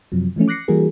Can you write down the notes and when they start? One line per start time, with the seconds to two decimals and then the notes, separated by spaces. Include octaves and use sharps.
0.12 F#2 C3 F3 F#3
0.36 E3 F3 A3 C#4
0.48 D6 F#6 A#6 C7 C#7
0.68 E3 G3 A#3 F#4 G#4 A#4